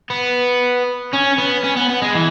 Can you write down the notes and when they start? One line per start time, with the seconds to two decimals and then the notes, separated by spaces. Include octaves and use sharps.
0.10 B3
1.13 C#4
1.38 B3
1.64 C#4
1.76 B3
1.89 B3
2.02 G#3
2.15 E3